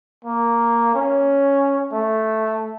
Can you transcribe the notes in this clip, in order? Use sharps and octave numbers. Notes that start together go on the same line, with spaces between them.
A#3
C#4
A3